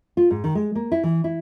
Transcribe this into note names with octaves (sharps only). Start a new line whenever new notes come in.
F4
G#2
D#3
G#3
A#3
E4
E3
E4